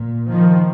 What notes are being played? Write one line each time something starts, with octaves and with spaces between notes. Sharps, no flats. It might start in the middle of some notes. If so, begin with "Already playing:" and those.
Already playing: A#2
D#3 F3